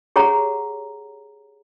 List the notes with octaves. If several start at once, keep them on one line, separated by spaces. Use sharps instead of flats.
G4 G#4 C#5 F#5 A#5